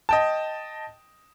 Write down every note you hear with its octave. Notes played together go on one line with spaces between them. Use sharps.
D#5 G5 A5